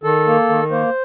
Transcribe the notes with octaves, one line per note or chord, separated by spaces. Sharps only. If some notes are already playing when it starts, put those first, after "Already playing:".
D#3 A4
A#3
D#3
A#3 C5